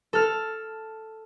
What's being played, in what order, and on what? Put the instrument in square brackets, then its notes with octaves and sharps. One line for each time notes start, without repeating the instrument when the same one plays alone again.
[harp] A4 F6